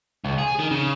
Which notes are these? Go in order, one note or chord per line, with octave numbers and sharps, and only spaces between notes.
C#2
G#4
D#3
C#3